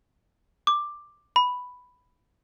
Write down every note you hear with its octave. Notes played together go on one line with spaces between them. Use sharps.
D6
B5